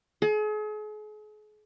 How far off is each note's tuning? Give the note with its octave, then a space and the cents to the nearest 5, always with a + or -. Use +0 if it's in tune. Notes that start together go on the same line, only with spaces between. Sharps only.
G#4 +40